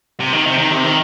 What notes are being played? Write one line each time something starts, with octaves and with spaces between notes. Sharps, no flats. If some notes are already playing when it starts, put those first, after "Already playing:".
C3
D#3
C3
D#3
C3
D#3